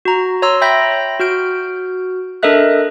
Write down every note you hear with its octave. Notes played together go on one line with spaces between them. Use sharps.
F#4 A#5
C#5 A#5 C6 E6
E5 G5 B5 G6 A#6
F#4 F6 G6 D7
D4 A4 A#4 D#5 E5 F#6